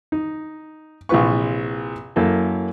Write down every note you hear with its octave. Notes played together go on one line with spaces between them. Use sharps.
D#4
A#1 C3 E3 F4 B4 C#6
F#2 A#3 E4 A4